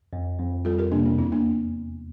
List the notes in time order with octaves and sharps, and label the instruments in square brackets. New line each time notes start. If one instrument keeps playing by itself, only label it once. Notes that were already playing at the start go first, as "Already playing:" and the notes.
[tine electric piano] F2
F2
[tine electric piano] G3 [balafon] F4 A4
[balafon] G4 A#4
[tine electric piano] C3 [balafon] A#3 D4
[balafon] C4
[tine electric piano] E2 [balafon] C4 E4
[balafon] A#3 D4